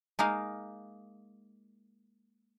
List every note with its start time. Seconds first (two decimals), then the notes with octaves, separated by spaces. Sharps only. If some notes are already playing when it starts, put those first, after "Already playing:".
0.19 G#3 A#3 D#4 F5